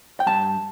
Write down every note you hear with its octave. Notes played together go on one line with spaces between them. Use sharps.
G5
G2 A5